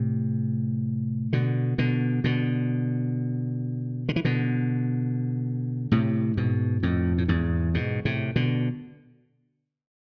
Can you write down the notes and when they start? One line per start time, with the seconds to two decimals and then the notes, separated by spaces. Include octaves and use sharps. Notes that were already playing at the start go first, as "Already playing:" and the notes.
Already playing: A2 C3
1.33 B2 D3
1.78 B2 D3
2.24 B2 D3
4.09 D3
4.16 E3
4.25 B2 D3
5.92 A2 C3
6.37 G#2 B2
6.83 F2 A2
7.18 A2
7.28 E2 G#2
7.74 G#2 B2
8.05 A2 C3
8.36 B2 D3